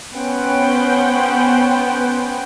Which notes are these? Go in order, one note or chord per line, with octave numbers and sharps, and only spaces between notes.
B3 C#4 B4 C5 F#5 G5